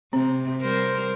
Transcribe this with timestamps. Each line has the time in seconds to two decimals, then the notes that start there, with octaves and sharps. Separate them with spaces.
0.13 C3 C4
0.61 G3 A#4 C5